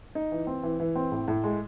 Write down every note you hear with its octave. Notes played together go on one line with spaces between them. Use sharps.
D#4
E3
C4
E3
E3
C4
A2
A2
G#3